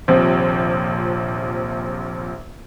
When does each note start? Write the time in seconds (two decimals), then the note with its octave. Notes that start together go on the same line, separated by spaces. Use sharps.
0.08 D#1 A#1 C3 F3 C5